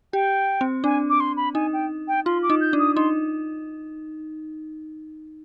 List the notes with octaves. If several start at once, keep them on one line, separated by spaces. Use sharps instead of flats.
G4 G5
C4
D4 G#5
D6
C6
B5
D#4 G#5
G5
G5
F4 C6
D6
D#4
G6
D4
D#6
D#4 C6